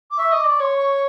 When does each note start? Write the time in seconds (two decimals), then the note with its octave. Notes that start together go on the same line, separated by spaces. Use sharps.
0.11 D6
0.18 E5 C#6
0.32 D#5
0.38 D6
0.45 D5
0.50 C#6
0.60 C#5 C6
0.76 C#6